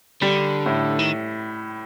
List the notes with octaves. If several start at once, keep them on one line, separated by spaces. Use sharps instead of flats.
D3 G3
A2
D#3